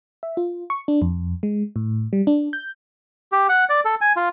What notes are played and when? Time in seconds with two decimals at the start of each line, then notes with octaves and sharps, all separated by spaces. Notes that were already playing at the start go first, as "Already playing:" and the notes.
0.23 E5
0.37 F4
0.70 C#6
0.88 D4
1.02 F2
1.43 G#3
1.76 A2
2.13 G3
2.27 D4
2.53 G6
3.32 G4
3.49 F#5
3.69 D5
3.85 A4
4.01 G#5
4.16 F4